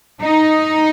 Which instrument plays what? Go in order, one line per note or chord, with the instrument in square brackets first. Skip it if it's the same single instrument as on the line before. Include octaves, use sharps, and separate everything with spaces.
[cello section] D#4